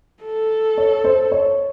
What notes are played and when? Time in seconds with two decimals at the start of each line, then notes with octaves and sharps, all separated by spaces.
0.23 A4
0.78 C#5
1.04 C5
1.32 C#5